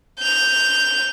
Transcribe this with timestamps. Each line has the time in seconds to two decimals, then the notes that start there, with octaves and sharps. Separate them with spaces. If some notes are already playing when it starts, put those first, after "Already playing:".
0.19 G6 F7